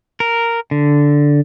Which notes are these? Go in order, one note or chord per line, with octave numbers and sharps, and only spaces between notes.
A#4
D3